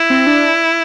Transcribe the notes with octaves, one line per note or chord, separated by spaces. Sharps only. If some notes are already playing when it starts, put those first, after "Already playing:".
Already playing: E4
C4
D4